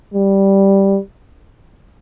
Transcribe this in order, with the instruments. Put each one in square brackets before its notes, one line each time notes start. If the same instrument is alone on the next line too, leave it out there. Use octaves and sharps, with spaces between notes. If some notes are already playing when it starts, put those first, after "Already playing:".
[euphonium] G3